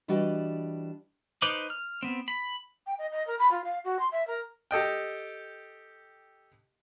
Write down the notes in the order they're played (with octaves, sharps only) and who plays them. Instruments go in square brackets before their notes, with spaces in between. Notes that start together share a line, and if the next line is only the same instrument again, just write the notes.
[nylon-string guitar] E3 G3 D4 F#4 D5 D#5
[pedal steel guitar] D#4 B4 C5 D6
F6
B3 C4
B5
[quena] G5
D#5
D#5
A#4
B5
F4
F5
F#4
C6
E5
A#4
[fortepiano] G4 A4 D#5 G5